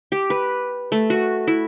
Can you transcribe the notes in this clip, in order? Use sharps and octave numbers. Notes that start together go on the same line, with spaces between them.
G4
B4
A3
F#4
E4